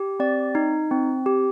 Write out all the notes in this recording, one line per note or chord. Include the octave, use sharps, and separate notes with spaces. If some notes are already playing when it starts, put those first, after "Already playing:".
Already playing: G4
C4 D5
D#4
C4
G4